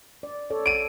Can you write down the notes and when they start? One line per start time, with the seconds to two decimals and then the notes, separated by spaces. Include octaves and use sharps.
0.23 D5
0.50 A4 C#5 D5
0.66 D7 D#7